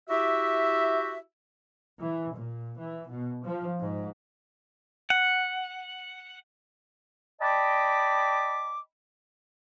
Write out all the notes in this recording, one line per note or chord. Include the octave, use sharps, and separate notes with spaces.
E4 F#4 G4 E5
E3
A#2
E3
B2
F3
G#2
F#5
D5 D#5 G5 A5 B5 D6